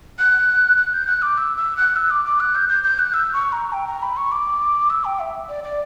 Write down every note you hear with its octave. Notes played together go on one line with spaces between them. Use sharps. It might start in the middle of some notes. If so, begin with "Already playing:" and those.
F#6
F#6
G6
F#6
D6
E6
E6
F#6
E6
D6
D6
F#6
G6
G6
G6
F#6
E6
C#6
A#5
G5
A#5
B5
C#6
D6
E6
G5
E5
D5
D5